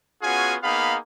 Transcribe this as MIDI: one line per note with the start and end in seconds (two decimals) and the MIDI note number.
0.22 0.56 59
0.22 0.56 61
0.22 0.56 65
0.22 0.56 66
0.22 0.56 68
0.22 0.56 80
0.63 0.97 58
0.63 0.97 59
0.63 0.97 63
0.63 0.97 68
0.63 0.97 77
0.63 0.97 83